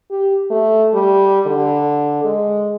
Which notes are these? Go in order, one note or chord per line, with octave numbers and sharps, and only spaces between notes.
G4
A3
G3
D3
G#3